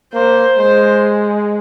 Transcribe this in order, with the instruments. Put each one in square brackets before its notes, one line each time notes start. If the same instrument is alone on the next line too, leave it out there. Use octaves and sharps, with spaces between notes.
[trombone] A#3 [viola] C5
[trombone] G#3 [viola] C5